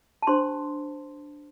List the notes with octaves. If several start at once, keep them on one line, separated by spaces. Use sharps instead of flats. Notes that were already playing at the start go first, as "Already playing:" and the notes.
A5
D4 G4 C5 C6